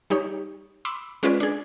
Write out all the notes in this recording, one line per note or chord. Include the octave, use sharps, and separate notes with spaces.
G3 D#4 G4 C#5
B5 C6 D6 E6
G#3 C#4 F4 G#4 B4 D5
D4 G#4